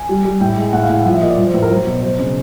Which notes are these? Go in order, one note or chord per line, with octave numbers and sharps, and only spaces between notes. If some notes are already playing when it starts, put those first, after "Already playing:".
Already playing: G#5
G3
G3
A2 G5
G#3
A2 F#5
F5
A2 F#5
F3 F#5
E5
A#2 D#5
D5
F3
C5
A2 B4
A#4
F#3 C5
B2
F#3 C5
C#3